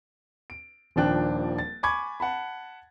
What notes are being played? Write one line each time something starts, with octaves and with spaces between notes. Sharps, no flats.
D7
D#1 D#2 F3 D4 G5 F#6
A6
G#5 B5 C#6 D6 G#6
F#5 A5 B5